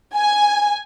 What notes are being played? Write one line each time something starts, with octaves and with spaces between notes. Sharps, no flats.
G#5